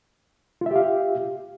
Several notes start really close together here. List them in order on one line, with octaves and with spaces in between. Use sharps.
F4 E5 G4 F5